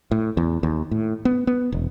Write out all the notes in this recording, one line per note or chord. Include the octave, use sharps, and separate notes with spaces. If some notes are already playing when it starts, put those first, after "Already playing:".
A2
E2
D#2
A2
B3
B3
E1